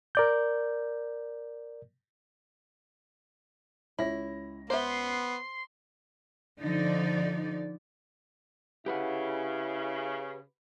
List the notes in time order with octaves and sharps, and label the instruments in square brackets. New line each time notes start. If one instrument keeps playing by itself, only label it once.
[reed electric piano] A#4 D5 G6
[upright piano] C#2 C#5 A#6 [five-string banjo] E4
[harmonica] B3 [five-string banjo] C5 E5 [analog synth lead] C6
[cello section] D3 F3 D#4 D5
[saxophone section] C#3 [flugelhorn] E4 [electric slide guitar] G4 B4 F#5